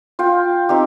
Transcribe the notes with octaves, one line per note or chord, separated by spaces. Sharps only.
F4 G5
C4 D#4 G4